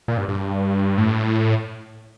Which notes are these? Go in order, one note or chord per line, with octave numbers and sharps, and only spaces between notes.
A#2
G2
G2
A2